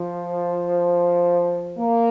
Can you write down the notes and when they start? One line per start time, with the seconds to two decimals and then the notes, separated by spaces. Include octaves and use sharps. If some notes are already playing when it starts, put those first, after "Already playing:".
Already playing: F3
1.78 A#3